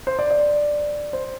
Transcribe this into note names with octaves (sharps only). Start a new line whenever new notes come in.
C5
D5
D5
C5